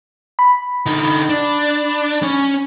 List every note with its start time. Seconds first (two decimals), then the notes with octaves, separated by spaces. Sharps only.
0.39 B5
0.86 D3 D#4
1.29 D4
2.23 C#4